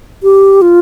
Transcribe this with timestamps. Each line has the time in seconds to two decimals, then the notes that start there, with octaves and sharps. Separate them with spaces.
0.23 G4
0.62 F4